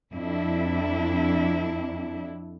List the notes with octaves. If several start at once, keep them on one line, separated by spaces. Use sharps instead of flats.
F2 D4 E4